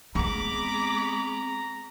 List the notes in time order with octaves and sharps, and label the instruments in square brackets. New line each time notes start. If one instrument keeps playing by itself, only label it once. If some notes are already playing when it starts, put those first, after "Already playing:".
[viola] G#3 B5 [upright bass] B3 C4 [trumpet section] A#5 [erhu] D6